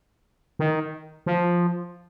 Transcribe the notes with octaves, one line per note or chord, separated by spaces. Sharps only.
D#3
F3